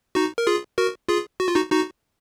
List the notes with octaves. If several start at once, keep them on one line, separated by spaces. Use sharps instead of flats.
D#4 F#4
A#4
F4 G#4
F#4 A#4
F4 G#4
F#4
F4
D#4 F#4
D#4 F#4